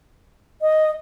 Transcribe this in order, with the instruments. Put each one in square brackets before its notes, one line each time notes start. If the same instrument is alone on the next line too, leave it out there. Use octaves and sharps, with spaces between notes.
[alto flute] D#5